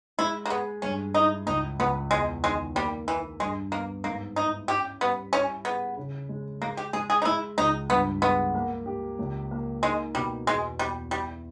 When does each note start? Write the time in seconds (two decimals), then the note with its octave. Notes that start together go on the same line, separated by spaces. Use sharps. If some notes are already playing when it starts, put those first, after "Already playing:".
0.19 G#3 E4
0.45 A#3
0.50 B3 G#4
0.82 G2 C#4
1.14 D#4 E4
1.46 C#2 D#4
1.79 C#2 B3
2.11 E2 G#3
2.43 D#3 G#3
2.75 G3 A#3
3.07 E3 A#3
3.40 G2 G#3
3.72 A#3 B3
4.04 G#2 A#3
4.36 D#4 E4
4.68 C#4 G4
5.01 G3 B3
5.33 C#4 E4
5.65 B3 G#4
5.97 C#3
6.29 G#3
6.62 G#3 A#3
6.77 G4
6.93 G#3 G#4
7.10 G#4
7.22 D#4
7.25 G#3 E4
7.58 C#2 D#4
7.90 G2 B3
8.22 G#3 B3
8.55 A#3
8.86 G4
9.19 C#2
9.51 A#3
9.83 G#3 D#4
10.15 B2 G3
10.47 E2 G#3
10.79 E2 G3
11.11 G3 E4